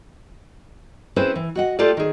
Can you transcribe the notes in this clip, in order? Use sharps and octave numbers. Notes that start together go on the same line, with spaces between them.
C4 C#4 E4 G#4 B4 C5
E3
F#4 D#5 F#5
A3 F4 G4 A4 D5
D#3 G#4